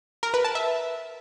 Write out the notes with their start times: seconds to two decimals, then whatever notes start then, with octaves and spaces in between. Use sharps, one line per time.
0.23 A#4
0.34 B4
0.44 A5
0.55 E5